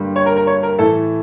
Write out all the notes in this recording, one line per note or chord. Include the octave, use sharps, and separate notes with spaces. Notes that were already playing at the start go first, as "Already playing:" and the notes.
Already playing: G2 D3 G3 A#3
C#5
A#4
A#4
C#5
A#4
A2 E3 A3 A4